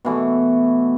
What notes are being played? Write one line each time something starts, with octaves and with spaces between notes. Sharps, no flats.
B2 E3 A3